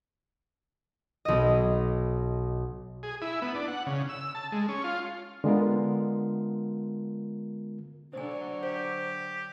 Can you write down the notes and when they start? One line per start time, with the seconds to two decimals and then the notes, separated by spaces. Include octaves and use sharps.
1.25 B1 D#5
3.03 G#4
3.22 E4
3.42 B3
3.55 D4
3.68 F#5
3.86 C#3
4.09 E6
4.35 A5
4.52 G#3
4.68 C#4
4.84 F4
5.44 D3 G#3 B3 F4 A#4
8.13 D3 F#3 C5 G#5
8.63 G4 C5